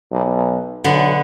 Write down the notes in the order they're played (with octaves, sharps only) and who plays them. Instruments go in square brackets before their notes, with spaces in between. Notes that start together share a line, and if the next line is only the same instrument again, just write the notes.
[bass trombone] B1
[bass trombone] B1 [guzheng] D3 B3